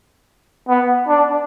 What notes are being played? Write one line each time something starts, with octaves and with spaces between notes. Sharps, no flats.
B3
D4